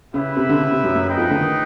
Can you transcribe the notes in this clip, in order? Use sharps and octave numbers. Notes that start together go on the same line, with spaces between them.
C#3 E4 G4 B4 E5
C3
D3
C#3
C3
F#2 F#3
F#2 F#3
D#4 G#4 B4 D#5 G5
F2 F3
D2 D3
D#3